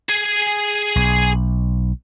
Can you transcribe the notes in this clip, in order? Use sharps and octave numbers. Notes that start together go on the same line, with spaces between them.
G#4 G#5
B1